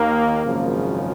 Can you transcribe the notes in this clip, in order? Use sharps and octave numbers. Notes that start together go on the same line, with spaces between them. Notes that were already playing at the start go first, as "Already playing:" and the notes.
Already playing: D#2 D#3 A#3
G#1 F#2 C#3 F3